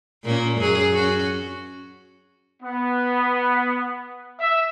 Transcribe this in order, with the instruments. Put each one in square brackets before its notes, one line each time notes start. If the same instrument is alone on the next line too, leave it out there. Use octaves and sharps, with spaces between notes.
[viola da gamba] A#2 A#3 C#4
F#2 F#3 G#4
C#4 F#4
[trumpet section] B3
E5